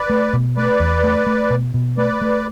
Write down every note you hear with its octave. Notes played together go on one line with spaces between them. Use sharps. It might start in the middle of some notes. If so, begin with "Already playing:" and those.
Already playing: B4 D5
A3
B2
A3 B4 D5
E2
A3
A3
B2
B2
A3 B4 D5
A3